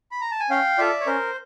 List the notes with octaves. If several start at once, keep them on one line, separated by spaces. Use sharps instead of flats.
B5
A#5
A5
G#5
C#4 F5 G5
F4 A4 D5 E5
C#5
C#4 A#4 C5